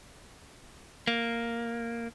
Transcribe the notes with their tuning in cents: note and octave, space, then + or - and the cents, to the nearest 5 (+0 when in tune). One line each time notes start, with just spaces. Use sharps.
A#3 -5